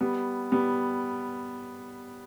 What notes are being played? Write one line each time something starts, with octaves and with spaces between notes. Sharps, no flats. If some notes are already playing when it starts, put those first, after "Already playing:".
G3 B3
G3 B3